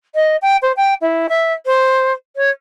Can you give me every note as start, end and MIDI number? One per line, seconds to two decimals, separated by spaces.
0.15 0.36 75
0.42 0.57 79
0.62 0.72 72
0.77 0.94 79
1.02 1.27 64
1.29 1.53 76
1.66 2.13 72
2.36 2.50 73